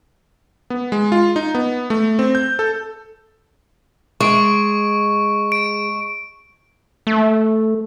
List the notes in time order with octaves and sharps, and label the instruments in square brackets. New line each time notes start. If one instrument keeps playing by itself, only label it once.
[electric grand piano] B3
G#3
F4
D#4
B3
A3
C4
G6
A4
[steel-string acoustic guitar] G#3 [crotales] C#6 D7
[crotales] D7
[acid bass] A3